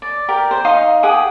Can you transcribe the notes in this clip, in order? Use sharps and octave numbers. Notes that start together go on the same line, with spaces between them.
D5
G4 A#4 D5
C5
D#4 D#5 F5 C6
G4 G#4 F#5 D#6